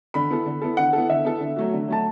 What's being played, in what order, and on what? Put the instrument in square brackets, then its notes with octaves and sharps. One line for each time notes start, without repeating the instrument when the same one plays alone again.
[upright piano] D3 [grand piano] B5
[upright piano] B3 E4 A4
D3
B3 E4 A4
[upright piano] D3 [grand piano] F#5
[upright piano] B3 E4 A4
[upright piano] D3 [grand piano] E5
[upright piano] B3 E4 A4
D3
F#3 A3 F#4
D3
[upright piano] F#3 A3 F#4 [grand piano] A5